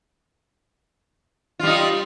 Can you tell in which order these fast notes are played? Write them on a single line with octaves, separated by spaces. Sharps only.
F4 G3 D#4